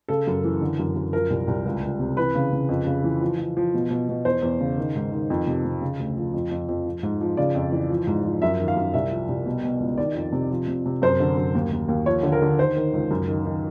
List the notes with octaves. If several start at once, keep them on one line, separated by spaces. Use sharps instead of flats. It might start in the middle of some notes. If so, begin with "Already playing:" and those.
C#3 A4
F#2
E3
D3
F#2
F#2
F3 A#4
C2
C2
C#2
C#2
C3
E3 B4
C#3
C#3
F2
C#3
E3
F3
F3
F3
B2
B2
B2
E2 C5
E2
C#3
D#3
G#2
D#3
F2
C3
C3
C#3
D2
F3
F2
F2
F2
F3
G#2
F3
C#3 D5
F2
E3
F3
G#2
F3
F#2 E5
D#3
F5
F#2
C2 E5
F3
C2
B2
B2
C#2
D#3 D5
F2
C3
F3
C3
C3
F#2 C5
D3
F#2
D#2
D#2
D#2
F3 C#5
D3
A#4
D3
D#3 C5
D#3
C#2
F#2
D#3
D#3